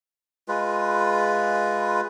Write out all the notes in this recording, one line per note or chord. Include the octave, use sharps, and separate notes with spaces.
G#3 F4 B4